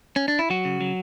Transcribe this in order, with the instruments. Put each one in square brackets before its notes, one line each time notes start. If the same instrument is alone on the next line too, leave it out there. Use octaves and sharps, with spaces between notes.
[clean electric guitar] C#4
D4
E4
F#3 F#4
C#3
F#3